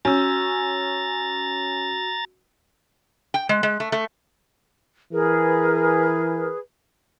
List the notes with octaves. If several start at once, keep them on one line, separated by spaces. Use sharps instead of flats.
C#4 F#4 A#5 E6 A6
G5
G#3
G#3
A3
A3
E3 G#4 A#4 B4